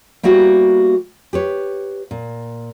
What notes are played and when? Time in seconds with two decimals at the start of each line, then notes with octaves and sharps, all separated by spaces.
0.23 G3 A#3 B3 E4 F#4 G4
1.33 G4 B4 C#5
2.11 A#2